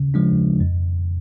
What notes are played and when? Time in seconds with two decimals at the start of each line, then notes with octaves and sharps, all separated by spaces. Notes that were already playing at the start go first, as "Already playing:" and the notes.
Already playing: C#3
0.14 F3 G#3 D4
0.60 F2